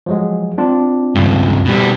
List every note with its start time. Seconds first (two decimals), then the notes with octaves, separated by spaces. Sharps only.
0.06 F3 F#3 G#3
0.58 C4 D4 F4
1.15 C#2 G2
1.65 B2 G3